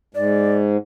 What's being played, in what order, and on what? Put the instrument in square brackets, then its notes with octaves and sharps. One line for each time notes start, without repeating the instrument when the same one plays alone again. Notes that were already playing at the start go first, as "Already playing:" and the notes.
[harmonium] G#2 [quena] D5